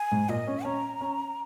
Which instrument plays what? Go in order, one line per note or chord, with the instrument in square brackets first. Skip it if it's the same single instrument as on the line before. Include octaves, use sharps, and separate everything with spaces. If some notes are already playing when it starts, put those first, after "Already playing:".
Already playing: [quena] G#5
[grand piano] G#2
[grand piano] A#2 [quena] D#5
[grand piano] C#4
[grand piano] C#4 [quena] A#5
[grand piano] C#4